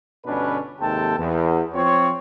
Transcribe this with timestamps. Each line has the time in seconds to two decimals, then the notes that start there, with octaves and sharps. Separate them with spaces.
0.25 G1 B2 C#4 D4 B4
0.80 D#2 G#2 C3 A4 G5 A5
1.18 E2
1.73 F3 C4 F4 C#5